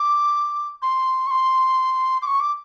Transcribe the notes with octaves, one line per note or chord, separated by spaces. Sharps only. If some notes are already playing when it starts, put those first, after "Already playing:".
Already playing: D6
C6
C#6
C6
D6
C#6
D6